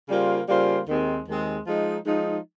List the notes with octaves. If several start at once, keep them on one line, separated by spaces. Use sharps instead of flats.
C#3 G3 A#3 F4 C5
C#3 G3 A#3 F4 C5
D#2 D#3 G#3 C4
D#2 D#3 G#3 C4
F3 G#3 D#4
F3 G#3 D#4